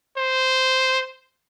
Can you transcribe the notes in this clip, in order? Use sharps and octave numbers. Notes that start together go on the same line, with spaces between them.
C5